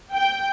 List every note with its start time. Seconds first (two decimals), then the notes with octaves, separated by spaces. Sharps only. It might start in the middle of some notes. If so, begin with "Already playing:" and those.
0.13 G5